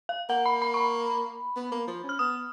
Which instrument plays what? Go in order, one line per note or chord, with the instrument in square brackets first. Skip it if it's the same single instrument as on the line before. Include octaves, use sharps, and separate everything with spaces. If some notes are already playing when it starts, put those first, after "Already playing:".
[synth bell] F5
[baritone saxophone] A#3 [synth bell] F#5
[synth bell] B5
B5
C#6
B5
[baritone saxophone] B3
A#3
F3
C#4
[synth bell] F6
[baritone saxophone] B3 [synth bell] D#6